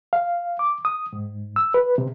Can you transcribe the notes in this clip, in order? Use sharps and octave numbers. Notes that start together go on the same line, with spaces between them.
F5
D6
D#6
G#2
E6
B4
C3